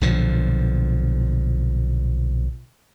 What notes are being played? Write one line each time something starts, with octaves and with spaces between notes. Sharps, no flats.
B1 A#2 D3 F3